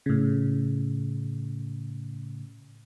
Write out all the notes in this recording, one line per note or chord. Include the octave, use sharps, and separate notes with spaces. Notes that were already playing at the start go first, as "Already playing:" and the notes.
A2 C#3